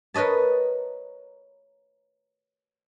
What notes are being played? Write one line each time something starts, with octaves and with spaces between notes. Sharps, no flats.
A#4 B4 C#5 D#5 A5